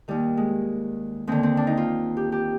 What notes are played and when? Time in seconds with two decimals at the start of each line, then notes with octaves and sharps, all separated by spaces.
0.08 D#2 D#3 G3
0.37 G#3
1.27 D#2 D3 C4
1.43 C4
1.57 D4
1.67 D#4
1.77 F4
2.17 G4
2.32 G4